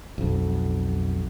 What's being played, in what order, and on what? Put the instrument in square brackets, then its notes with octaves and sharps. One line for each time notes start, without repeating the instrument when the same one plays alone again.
[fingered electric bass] B1 F2